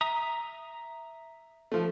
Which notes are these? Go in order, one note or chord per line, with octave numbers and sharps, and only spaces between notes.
E5 A#5 D#6
F3 A3